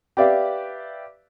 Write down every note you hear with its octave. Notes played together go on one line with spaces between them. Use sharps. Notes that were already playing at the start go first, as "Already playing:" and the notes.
G4 B4 D5 E5 F5